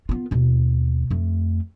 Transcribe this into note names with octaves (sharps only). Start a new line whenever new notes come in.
B3 F4
D#2 B2
F2 A3